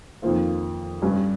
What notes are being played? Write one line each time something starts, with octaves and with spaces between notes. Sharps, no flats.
F2 D#3 A#3 F4 C5
G2 G3 C#4